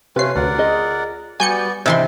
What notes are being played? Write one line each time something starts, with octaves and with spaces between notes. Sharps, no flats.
C3 A3 C#4 F4 B4 C#5 C7
D2 A#4 D5 F#5
F4 G#4 D#5
G3 B3 F#4 G4 D5 G#5 G6 C#7
C3 E3 D#5 G5 C6